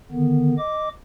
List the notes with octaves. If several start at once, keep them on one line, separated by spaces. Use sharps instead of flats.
D3 D#3 B3
D#5 D6